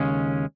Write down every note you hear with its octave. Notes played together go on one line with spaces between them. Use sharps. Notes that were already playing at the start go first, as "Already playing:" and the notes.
Already playing: D#2 C#3 G#3 C#4